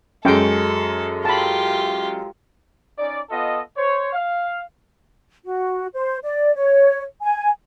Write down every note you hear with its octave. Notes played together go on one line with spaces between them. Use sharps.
F#2 G#3 C#4 A4 G5
F4 G4 A5 B5
C#4 D#4 D5
B3 F4 A4 D#5
C5 C#5
F5
F#4
C5
D5
C#5
G#5